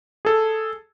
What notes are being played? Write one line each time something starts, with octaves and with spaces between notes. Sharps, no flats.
G#4 A4